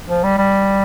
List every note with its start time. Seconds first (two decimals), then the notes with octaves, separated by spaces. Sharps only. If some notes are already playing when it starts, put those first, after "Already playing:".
0.09 F3
0.23 G3
0.38 G3